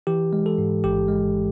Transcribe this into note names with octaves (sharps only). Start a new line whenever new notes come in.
E3 G4
G#3
A4
G#2
A1 G4
G#3